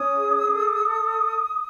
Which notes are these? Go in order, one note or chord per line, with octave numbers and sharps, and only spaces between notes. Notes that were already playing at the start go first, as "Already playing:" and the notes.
Already playing: C#4 D#6
G#4
A4